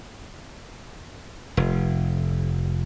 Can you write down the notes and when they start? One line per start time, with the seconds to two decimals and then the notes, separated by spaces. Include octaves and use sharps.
1.57 F1